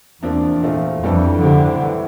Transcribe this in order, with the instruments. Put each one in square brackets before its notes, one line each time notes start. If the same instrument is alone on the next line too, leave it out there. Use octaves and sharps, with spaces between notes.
[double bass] E2 [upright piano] C3 F3 A#3 D4
[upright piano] A#2 A3 C4 F4
[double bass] F2 [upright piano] A2 E3 G3 D4 A4
[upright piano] A2 G3 C4 G4 C5 [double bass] D3
[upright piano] A2 E3